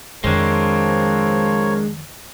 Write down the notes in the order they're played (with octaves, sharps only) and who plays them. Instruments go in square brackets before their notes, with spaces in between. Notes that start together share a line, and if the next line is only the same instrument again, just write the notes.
[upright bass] F2 D#3 [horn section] F3 C4 [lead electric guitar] G#3 D4 [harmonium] A#4 C#5